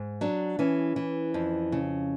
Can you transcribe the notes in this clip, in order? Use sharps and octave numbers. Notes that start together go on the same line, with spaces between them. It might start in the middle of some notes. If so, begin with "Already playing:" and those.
Already playing: G#2
F#3 D4
E3 C#4
E3
F2
C#3